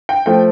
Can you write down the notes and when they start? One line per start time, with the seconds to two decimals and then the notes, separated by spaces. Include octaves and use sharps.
0.09 G5
0.26 F3 A3 G5